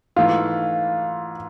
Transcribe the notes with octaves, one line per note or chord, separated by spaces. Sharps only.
G#2 E3 A3 F4